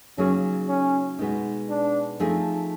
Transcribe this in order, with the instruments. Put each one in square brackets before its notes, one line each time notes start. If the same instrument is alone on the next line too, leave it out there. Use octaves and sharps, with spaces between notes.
[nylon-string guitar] C#3 F#3 A#3 D#4 G#4 [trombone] C#4
[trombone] C#4
[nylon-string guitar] B2 G#3 B3 D#4
[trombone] D4
[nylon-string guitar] F3 A3 C4 D#4 G#4